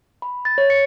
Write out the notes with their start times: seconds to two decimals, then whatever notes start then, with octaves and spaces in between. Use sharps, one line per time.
0.22 B5
0.45 A6
0.58 C#5
0.70 C#7